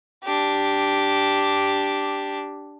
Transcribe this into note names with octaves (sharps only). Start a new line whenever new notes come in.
D4 G4